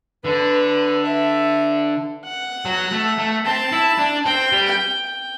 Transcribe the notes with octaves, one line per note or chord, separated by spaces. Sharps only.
D3 B4
E5
F#5
F#3
A3
A3
C4 A5
E4
D4
C4 G5
G3
G5
G5